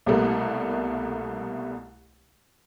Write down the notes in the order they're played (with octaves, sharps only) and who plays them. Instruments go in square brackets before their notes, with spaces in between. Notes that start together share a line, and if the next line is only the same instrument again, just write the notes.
[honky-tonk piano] C2 B2 G3 A3 A#3